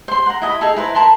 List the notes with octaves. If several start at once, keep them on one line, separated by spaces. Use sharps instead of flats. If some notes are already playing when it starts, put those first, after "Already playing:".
C5 C6
F#5 A#5
E4 D#5 A5 B5
D#4 G#4 A4
E4 B4 C5 A#5
A#4 A5 B5 C6